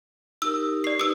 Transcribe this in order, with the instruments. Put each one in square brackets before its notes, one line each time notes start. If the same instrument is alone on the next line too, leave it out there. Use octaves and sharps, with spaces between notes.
[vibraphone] D#4 G4 A#4 [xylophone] E6
[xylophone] D5 C7 [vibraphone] C#6
[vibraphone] D#4 G4 B4 [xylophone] D#6 E6